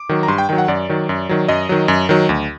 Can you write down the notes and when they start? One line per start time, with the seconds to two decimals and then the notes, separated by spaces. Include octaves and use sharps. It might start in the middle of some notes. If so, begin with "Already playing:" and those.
Already playing: D6
0.09 D#3 F#3
0.23 A#5
0.28 G2 C6
0.38 G5
0.49 D#3 F#3 G5
0.58 F#5
0.68 F#2 D5
0.89 D#3 F#3
1.09 F#2
1.29 D#3 F#3
1.48 F#2 D#5
1.69 D#3 F#3
1.88 F#2
2.09 D#3 F#3
2.29 D2